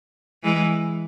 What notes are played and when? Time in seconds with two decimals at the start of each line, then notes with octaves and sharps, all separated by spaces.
0.44 E3 G#3